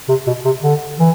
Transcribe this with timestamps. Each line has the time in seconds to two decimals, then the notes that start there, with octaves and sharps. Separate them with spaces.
0.09 C3
0.27 B2
0.45 C3
0.63 D3
0.99 E3